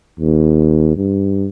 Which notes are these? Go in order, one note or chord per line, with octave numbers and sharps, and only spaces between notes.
D#2
G2